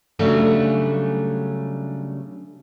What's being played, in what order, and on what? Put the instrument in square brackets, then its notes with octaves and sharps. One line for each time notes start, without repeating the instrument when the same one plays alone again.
[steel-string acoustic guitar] C#3 F#3 G3 A3 D4